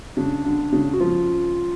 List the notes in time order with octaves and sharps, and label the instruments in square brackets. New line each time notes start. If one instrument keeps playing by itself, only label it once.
[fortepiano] C#3 [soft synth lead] D4
[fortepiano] D3
C#3
[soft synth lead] F#4
[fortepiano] F3 [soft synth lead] F4